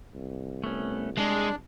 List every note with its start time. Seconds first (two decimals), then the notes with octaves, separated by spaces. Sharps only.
0.14 C2
0.64 A3 B3 C#4
1.18 G#3 D4 G#4